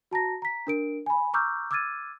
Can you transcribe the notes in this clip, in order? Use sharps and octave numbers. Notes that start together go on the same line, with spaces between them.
F#4 A5 A#5 A#6
A#5 B6
D4 A#4 D7
G#5 B5
A#5 C#6 D6 E6 F6 G6
D6 E6 F6 G#6 A6 D#7